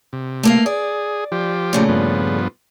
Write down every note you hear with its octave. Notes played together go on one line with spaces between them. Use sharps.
C3
A3 A#3 F5
G#4 D5
F3 G4
A#2 C#3 A3
G2 F3 B3